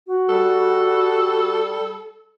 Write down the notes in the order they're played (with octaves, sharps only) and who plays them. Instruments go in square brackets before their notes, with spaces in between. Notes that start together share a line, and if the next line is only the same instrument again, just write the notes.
[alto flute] F#4
[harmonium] G3 [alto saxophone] A4